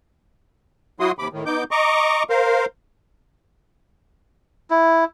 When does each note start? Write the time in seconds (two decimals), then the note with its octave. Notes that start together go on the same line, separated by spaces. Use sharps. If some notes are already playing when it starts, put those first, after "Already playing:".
1.00 F#3 E4 F#4 C6 D#6
1.19 D#2 C3 B5 D6
1.33 A2 D#3
1.46 B3 D#4 D6 G6
1.71 D#5 A#5 C#6 D6
2.30 A#4 C5 F5
4.70 E4